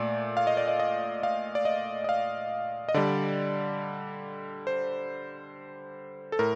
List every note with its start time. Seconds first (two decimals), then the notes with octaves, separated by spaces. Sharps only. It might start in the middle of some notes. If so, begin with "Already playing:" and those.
Already playing: A#2 A3 D5
0.37 F5
0.47 D#5
0.57 D5
0.68 D#5
0.80 D#5
1.23 F5
1.55 D5
1.65 D#5
2.04 D#5
2.09 F5
2.89 D#5
2.94 D3 G3 D5
4.67 C5
6.32 A4
6.39 A2 A#4